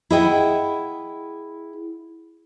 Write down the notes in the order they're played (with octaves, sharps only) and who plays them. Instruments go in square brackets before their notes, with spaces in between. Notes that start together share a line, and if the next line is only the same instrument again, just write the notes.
[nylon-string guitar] E4 G#4 D#5 F#5 G5